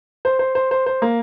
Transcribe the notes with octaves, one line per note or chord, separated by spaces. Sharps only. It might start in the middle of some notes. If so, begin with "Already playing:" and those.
C5
C5
C5
C5
C5
A#3